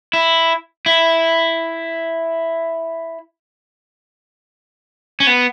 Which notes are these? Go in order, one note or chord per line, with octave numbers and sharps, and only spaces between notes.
E4
E4
C#4
B3